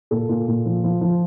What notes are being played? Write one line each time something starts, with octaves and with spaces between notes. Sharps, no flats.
A#2 A4
A#2
A#2
F3
F3
F3